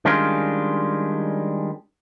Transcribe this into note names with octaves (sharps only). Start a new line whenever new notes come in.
D#3 G3 G#3 C#4 D4 F4